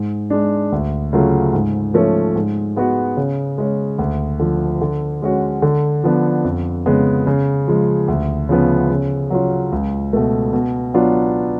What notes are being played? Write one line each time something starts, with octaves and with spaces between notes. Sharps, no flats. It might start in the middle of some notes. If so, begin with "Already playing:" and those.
Already playing: G#2
G#3 D4
D2
C#3 F#3 A3 F4
G#2
F3 A3 C#4
G#2
G#3 B3 F#4
C#3
G#3 C#4
D2
D3 F3
D3
G#3 C#4 F#4
D3
F3 B3 D4
F2
C#3 G#3 B3
C#3
F3 G#3
D2
C#3 F3 B3
C#3
F#3 C#4 F4
C#2
B2 A3
B2
F#3 B3 D4 F4